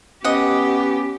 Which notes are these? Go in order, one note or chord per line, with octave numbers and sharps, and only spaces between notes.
B3 C#4 G4 D#5 F#5